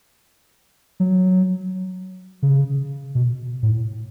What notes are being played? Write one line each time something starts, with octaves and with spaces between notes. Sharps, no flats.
F#3
C#3
B2
A2